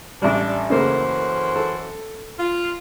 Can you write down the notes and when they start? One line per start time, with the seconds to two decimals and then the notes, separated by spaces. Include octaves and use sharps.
0.22 A1 G3 D4
0.70 F#2 C#3 E3 A3 A#3 C5
1.56 A4
2.39 F4